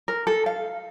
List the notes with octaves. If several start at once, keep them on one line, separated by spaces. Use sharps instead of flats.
A#4
A4
F5